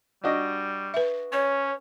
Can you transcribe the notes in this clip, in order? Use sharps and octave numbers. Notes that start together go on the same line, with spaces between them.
G3 D4 F#4 D#5
B4 E5
C#4 C#5